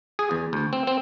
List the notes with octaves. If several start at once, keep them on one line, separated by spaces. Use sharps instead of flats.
G#4
E2
D2
C4
C4